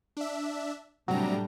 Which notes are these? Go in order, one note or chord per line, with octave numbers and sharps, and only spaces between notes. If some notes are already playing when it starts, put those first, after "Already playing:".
D4 E5
A2 C3 F#3 G3 D4 A#5